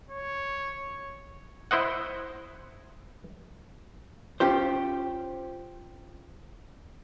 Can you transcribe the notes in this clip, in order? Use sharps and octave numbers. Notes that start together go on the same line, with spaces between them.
C#5
E4 C5 D#5 F#5
C#4 F4 G4 C5